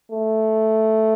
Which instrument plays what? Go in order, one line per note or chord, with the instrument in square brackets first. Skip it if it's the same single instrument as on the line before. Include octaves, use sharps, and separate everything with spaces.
[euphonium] A3